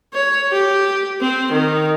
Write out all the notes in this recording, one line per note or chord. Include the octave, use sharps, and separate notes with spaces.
C#5
G4
C4
D#3